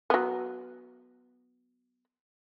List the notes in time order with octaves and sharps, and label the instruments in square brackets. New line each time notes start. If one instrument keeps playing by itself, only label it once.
[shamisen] F#3 B3